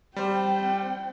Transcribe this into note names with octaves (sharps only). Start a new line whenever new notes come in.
G3 C4 C5 G5